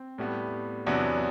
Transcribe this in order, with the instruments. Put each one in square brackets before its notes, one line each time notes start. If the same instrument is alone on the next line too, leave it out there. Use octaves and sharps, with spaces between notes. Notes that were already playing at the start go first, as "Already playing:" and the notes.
Already playing: [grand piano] C4
A2 G3 B3
E2 C3 F#3 B3 D4